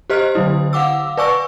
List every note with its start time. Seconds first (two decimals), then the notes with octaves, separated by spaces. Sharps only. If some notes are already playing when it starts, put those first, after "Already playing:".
0.10 G4 C5 D#5 F6
0.35 D3 F#3 E4
0.73 F5 F#5 D6 E6
1.17 B4 D5 G#5 C#6 E6